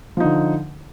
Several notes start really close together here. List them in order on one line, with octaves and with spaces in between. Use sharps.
F3 D#4 D3